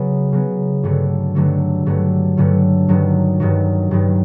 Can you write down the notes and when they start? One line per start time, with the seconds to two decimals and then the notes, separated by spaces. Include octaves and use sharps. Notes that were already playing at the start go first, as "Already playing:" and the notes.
Already playing: C#3 F#3 B3
0.32 C#3 F#3 B3
0.83 G2 D3 F#3 A3
1.35 G2 D3 F#3 A3
1.86 G2 D3 F#3 A3
2.37 G2 D3 F#3 A3
2.89 G2 D#3 F#3
3.40 G2 D#3 F#3
3.91 G2 D#3 F#3